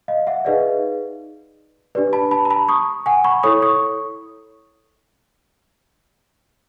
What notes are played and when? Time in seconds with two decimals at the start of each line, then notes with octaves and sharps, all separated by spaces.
0.08 D#5 F5
0.27 E5 F#5
0.45 D#4 G#4 B4 D5 D#5 F5
1.95 D4 G4 B4 D5
2.13 A5 B5
2.31 A5 B5
2.45 A#5
2.50 A5 B5
2.68 C#6 D#6
3.06 F#5 G#5
3.24 B5 C#6
3.43 E4 A4 C#5 C#6 D#6
3.62 C#6 D#6